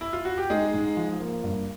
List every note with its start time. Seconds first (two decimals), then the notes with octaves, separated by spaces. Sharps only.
0.01 E4
0.13 F4
0.25 F#4
0.38 G4
0.50 G#3 D#4 G#4
0.74 G#2
0.97 F3
1.20 A#3
1.43 G2